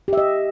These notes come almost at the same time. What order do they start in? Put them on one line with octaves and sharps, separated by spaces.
G4 E5 D#5